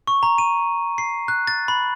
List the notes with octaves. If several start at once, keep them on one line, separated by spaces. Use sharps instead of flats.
C#6
A#5
D#7
C7
F#6
A6
B5